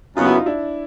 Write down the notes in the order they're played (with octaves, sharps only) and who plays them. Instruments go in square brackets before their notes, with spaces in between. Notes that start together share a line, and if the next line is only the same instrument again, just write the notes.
[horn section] F#2 C#3 F#3 B3 [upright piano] D#4 F4
[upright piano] E4 F#4
D#4 F4
D4 E4